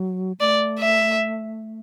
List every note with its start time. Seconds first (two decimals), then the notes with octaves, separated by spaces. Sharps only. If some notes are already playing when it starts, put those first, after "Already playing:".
Already playing: F#3
0.40 A3 D5
0.80 E5